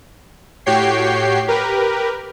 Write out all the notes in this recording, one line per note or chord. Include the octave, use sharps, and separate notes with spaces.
A2 F#4 G4 C#5 G5 C7
G4 A#4 B4